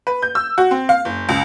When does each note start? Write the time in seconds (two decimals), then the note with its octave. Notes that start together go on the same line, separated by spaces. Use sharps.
0.07 B4
0.22 G6
0.35 E6
0.58 F#4
0.71 C4
0.89 F5
1.05 F#1
1.29 C#2